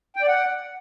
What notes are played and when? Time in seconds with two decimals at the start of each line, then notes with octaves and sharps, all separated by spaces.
0.16 G5
0.22 D5
0.28 F#5